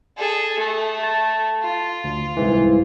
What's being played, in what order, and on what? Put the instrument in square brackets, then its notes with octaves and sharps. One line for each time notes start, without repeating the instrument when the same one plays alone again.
[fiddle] G#4 A4
A3
[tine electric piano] A5
[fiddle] F4
[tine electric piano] D2
C2 G#2 E3